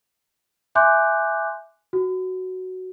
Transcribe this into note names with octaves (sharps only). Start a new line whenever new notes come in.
E5 G#5 C6 D6 F#6 G6
F#4